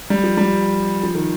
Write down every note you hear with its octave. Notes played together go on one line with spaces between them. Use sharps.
G3
F3
G3
F3
D#3